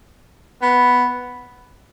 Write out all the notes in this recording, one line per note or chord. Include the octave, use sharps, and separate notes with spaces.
B3